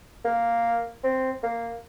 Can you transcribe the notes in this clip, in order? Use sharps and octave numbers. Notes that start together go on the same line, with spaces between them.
A#3
C4
A#3